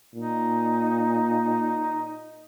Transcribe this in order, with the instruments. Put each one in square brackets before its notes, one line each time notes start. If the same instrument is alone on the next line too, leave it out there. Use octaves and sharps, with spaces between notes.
[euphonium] A#2 [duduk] D#4